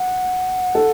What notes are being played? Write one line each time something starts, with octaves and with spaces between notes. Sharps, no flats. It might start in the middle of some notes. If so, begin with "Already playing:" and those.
Already playing: F#5
A4